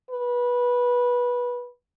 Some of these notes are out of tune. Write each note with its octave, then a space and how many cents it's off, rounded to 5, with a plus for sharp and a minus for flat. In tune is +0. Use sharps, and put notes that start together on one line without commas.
B4 -15